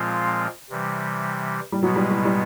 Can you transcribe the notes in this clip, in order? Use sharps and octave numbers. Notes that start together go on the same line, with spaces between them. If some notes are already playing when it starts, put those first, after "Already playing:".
Already playing: A#2 F3 G#3 C4 F4
C3 E3 G3
G3
B2 F#3 G#3 B3
G3
G3
G3